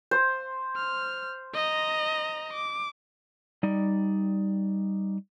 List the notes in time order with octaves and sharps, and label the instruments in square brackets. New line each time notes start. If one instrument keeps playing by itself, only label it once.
[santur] C5
[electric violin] F6
D#5 A#5
D6
[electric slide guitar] G3 D#4 D5